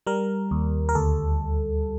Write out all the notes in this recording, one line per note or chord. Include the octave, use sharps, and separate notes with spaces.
G3 A#4
D#2
A#4
D2 A4